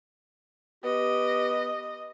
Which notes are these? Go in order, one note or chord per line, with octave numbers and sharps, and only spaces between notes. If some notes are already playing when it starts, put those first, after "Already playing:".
B3 G4 D#5